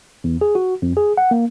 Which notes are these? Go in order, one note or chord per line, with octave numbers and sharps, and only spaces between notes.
E2
G#4
F#4
F2
G#4
F#5
A#3